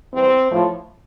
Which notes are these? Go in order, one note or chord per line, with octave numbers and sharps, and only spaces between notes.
E2 C3 G3 C4
A2 F3